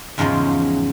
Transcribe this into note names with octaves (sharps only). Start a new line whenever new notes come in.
E2 G#2 C#3 F3 C#4